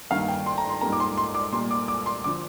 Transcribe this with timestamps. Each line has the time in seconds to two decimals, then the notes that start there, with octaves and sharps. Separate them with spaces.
0.10 G2 D#3 A#3 F5
0.28 G5
0.46 C6
0.58 A#5
0.70 C6
0.81 G#2 G3 A#3 A#5
0.92 D6
1.00 C6
1.17 C6
1.34 D6
1.52 A#2 G3 A#3 C6
1.71 D6
1.88 D6
2.06 C6
2.24 D3 F3 D6